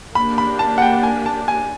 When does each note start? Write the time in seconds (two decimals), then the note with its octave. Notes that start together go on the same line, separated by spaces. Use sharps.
0.15 A#3 D4 G4 B5
0.38 B5
0.59 A5
0.78 F#5
0.82 G5
1.03 G#5
1.26 A5
1.48 G#5